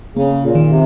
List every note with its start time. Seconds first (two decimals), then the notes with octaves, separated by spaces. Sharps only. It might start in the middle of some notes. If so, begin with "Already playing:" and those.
0.16 C#3 A#3
0.43 A#2
0.55 D#3
0.69 C3